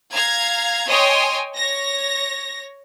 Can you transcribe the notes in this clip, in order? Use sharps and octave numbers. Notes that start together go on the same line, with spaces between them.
F5 A#5 G#6
C#5 D#5 G5 G#5 C6 D#6
C#5 A#6